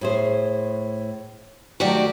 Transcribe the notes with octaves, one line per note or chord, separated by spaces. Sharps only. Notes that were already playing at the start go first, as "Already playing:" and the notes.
A2 G#4 C5
D#3 F#3 A3 F#4 G4 D5